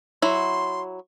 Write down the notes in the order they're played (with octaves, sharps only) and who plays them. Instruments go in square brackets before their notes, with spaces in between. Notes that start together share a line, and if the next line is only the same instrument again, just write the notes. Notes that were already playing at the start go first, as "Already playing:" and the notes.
[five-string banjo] F#3 E4 [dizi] C6